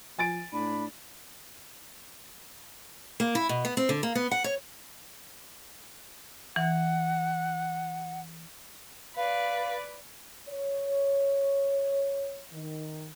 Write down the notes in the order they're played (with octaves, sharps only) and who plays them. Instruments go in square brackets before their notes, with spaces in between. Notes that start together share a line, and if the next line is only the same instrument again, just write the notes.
[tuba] F3 [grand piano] G#5 A6 D7
[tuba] A2 [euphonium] D4 [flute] B5
[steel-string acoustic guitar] A#3
E4
B2
B3
C4
D3
A#3
B3
F#5
C#5
[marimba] E3 [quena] F#5
[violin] B4 D5 [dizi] F5
[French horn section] C#5
D#3